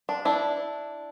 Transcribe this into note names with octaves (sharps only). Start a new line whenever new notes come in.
D4
D4 E4